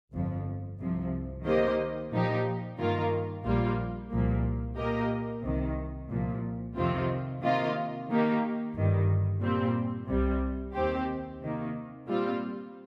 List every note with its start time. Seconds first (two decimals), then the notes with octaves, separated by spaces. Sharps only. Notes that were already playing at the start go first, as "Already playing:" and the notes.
0.13 G1 F2 F3
0.79 C2 C3 F3
1.46 D#3 A#3 G4 C5 D#5
2.12 A#2 F3 D#4 G4
2.79 G2 D#3 A#3 F4 A#4
3.45 A#1 A#2 G3 A#3 F4
4.11 C2 A#2 F3 A#3
4.77 A#2 A#3 G4 A#4 D#5
5.44 C2 C3 D#3
6.10 C2 A#2 F3
6.76 F2 C3 D#3 C4 F4
7.43 C3 D#3 A#3 F4 D#5
8.09 D#3 A#3 D#4 G4
8.75 G1 G2 D#3 G3
9.42 A#2 G3 C4
10.08 C2 C3 G3
10.75 D#2 D#3 C4 G4 C5
11.41 C3 D#3 A#3
12.07 A#2 G3 C4 F4